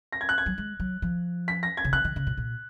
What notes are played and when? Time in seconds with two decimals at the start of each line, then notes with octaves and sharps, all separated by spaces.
0.12 A#6
0.21 G#6
0.29 F#6
0.38 G#6
0.46 F#3
0.58 G#3
0.80 F#3
1.02 F3
1.48 B6
1.63 A#6
1.77 G#6
1.85 C#3
1.93 D#3 F#6
2.05 D#3
2.16 C#3
2.27 A#2
2.37 A#2